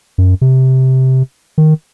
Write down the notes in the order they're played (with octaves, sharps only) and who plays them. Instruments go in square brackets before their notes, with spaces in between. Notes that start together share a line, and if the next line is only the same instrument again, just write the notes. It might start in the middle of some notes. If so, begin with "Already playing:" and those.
[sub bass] F#2
C3
D#3